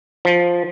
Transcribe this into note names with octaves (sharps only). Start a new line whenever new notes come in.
F3